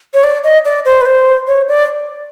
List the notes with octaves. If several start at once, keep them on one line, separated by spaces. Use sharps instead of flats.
C#5
D5
D#5
D5
C5
B4
C5
C#5
D5